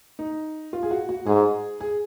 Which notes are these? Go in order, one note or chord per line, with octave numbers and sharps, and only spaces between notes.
D#4
F4
G#4
F#4
F#4
G#2 G#4
G#4